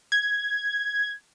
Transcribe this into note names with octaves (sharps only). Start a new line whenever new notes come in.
G#6